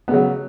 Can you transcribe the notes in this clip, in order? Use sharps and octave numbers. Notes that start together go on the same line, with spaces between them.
C#3 F#3 B3